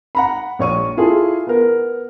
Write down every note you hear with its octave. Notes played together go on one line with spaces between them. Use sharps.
F#5 A#5 B5
A#1 C#5 C#6 D#7
E4 F4 G#4 A4
B3 A#4